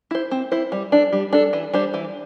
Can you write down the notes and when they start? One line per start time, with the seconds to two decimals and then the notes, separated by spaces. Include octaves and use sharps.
0.11 E4 C5
0.31 C4
0.52 E4 C5
0.72 G3
0.92 D4 A4
1.13 G3
1.33 D4 A4
1.53 E3
1.74 G3 D4 C5
1.94 E3